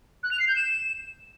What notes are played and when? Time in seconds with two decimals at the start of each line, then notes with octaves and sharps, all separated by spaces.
0.23 F#6
0.32 F7
0.40 C7
0.48 G6
0.56 E7